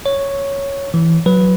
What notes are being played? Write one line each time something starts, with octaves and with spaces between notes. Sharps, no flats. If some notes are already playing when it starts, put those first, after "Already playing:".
C#5
E3
F#3 B4